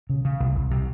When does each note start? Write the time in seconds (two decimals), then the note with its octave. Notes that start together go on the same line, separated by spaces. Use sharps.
0.10 C#3
0.25 C#3
0.40 C2
0.56 C2
0.71 C3